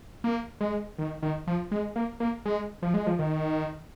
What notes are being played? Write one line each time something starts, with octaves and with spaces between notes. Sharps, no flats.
A#3
G#3
D#3
D#3
F3
G#3
A#3
A#3
G#3
F3
G#3
F3
D#3